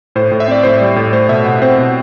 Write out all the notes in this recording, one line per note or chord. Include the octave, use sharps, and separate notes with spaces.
A2 C5
A2
E5
C4 D5
A2 C5
D5
G3
A2
A3 C5
B2 E5
B2 F#5
C4 C5
B2